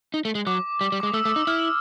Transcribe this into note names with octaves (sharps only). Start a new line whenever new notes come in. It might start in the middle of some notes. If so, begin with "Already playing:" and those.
D#4
A3
G#3
F#3 D6
G3
G3
D6
G#3
D#6
A3 E6
A3
D#4
E4 F6